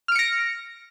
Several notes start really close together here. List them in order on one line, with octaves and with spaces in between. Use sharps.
F6 D7 C#7 A#6